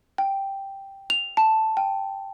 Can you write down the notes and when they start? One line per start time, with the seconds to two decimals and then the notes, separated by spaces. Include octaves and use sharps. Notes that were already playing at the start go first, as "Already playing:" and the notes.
0.18 G5
1.10 F7
1.37 A5
1.77 G5